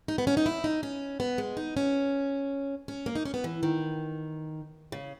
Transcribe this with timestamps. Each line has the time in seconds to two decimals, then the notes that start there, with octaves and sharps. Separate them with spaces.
0.08 D#4
0.18 B3
0.27 C#4
0.37 D#4
0.46 E4
0.64 D#4
0.83 C#4
1.20 B3
1.38 G#3
1.57 D#4
1.77 C#4
2.88 C#4
3.06 A#3
3.15 D#4
3.25 C#4
3.34 B3
3.44 E3
3.63 D#3
4.92 C#3